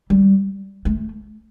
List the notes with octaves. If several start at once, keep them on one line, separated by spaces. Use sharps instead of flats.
G3
A3